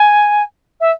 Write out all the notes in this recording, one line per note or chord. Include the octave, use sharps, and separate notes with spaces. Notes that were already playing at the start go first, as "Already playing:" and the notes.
Already playing: G#5
E5